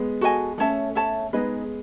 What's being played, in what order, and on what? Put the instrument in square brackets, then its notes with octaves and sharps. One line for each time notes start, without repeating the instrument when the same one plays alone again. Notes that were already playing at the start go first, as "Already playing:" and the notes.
Already playing: [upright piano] G#3 B3
[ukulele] F#4 A4 D#5 G#5
[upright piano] A3 C#4 [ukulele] A4 C#5 E5 A5
[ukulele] A4 C#5 E5 A5
[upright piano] G#3 B3 [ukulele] D#4 G#4 B4 D#5